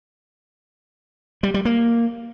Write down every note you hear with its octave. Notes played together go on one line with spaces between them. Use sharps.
G3
G3
A#3